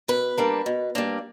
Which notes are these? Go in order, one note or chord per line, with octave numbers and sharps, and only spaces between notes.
B2 B4
G3 A#3 D4
B2
G3 A#3 D4